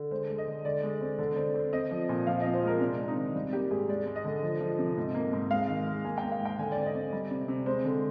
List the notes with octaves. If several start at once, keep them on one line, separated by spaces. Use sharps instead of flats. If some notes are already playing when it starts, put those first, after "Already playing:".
Already playing: D3
G#3 C5
G#3
D#5
D3
D3 D5
G#3
C4
D3
C4
C4
C4 D#5
F3
A#2
F3 F5
C4 D#5
C5
G#3 A#4
C3 D4
C3
D#4
D#3
G3
A#3 G4
G#2 G#4
G#3 D5
G#3
D#5
D3
F3
F3
C3
G#2
A#3
G#2
G#3 F5
D#3
G#3
A#3 G#5
G5
A#3
F5
G#2 G5
D3 G#5
C4 D5
D#5
C4
G3
C3
C3
G#3 C5
D3